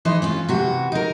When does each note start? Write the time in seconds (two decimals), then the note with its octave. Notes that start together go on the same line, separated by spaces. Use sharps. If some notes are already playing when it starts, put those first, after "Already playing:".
0.05 E3 D#4 C5
0.22 C4 C#4 F4
0.48 C3 E3 F#4
0.92 D#4 A#4